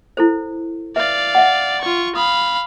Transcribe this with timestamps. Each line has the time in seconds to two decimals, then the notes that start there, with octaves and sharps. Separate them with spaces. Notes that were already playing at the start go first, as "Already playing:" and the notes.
0.17 E4 A4 C5
0.96 B4 D5 E5 F5
1.35 E5 F#5
1.82 F4 C#6
2.15 F5 B5 D#6